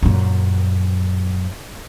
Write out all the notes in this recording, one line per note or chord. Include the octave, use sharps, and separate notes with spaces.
F#2 A#2